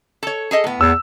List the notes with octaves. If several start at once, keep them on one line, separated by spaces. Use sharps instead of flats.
A4 C#5
G#4 A4 D#5
A2 B3
E2 E6